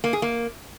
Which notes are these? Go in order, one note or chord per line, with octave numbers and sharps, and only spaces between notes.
A#3
G#4
A#3